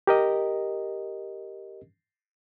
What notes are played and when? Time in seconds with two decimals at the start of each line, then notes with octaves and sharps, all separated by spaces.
0.07 G4 A#4 D#5